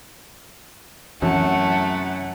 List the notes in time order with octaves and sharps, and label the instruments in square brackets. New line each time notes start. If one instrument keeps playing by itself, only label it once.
[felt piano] F#2 [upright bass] C3 E3 [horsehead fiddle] F#3 F#5 [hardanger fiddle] A3